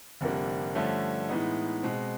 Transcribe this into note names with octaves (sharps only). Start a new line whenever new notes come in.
F1 F2 D3 G3 A#3
G2 D3 F3 A3 C#4
A2 E3 G#3 B3 D#4
B2 G#3 C4